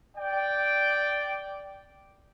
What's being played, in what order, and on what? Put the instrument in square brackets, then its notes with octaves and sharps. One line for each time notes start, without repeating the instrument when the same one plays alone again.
[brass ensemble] D5 G5